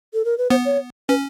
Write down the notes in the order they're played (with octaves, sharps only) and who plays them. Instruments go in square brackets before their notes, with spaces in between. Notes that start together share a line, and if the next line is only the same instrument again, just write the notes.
[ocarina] A4
A#4
B4
[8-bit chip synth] B3 [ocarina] C5
[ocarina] C#5
[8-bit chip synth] C#4 [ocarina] B4